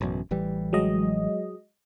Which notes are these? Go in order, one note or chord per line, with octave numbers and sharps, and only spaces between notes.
A1 F#2 B2
A1 E3 G3
F#3 G#3 D#5